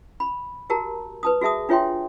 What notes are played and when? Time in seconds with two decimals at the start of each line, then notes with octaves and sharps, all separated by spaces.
0.20 B5
0.70 F#4 G4 A#4 A5 A#5
1.23 B4 A5 D#6
1.41 F#4 G#4 E5 A5 D#6
1.69 D4 F4 C#5 E5 G5 C6